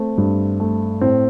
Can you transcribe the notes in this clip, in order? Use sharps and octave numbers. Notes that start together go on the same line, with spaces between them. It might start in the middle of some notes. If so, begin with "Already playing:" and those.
Already playing: A3 C4
G2
A3
A2 C4